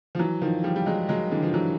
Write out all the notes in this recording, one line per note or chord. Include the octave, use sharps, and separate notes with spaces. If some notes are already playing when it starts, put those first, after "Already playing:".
F3
E3 F#3
D#3 F3
F3 G3
G3
F#3 G#3
F#3 G#3
D3 E3
F3
E3 F#3